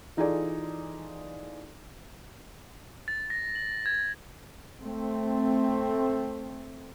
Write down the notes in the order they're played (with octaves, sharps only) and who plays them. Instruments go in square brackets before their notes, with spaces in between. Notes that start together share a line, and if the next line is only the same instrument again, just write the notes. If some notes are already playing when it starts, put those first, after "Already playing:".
[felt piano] E3 D#4 F4 G#4 A4 D5
[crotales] A6
A#6
F#7
G#6
[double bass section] A3 C4